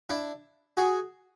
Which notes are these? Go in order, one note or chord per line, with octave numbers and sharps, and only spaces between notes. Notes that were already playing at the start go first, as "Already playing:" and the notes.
D4 E4
F#4 G#4